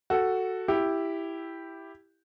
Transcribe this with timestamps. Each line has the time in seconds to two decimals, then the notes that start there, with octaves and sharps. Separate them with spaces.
0.10 F#4 A4
0.68 E4 G4